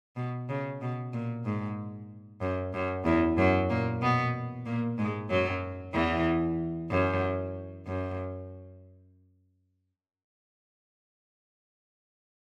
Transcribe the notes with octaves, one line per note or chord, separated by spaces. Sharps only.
B2
C#3
B2
A#2
G#2
F#2
F#2
E2 E3
F#2 F#3
A#2 A#3
B2 B3
A#2 A#3
G#2 G#3
F#2 F#3
E2 E3
F#2
F#2